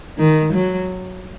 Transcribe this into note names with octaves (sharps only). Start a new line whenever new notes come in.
D#3
F#3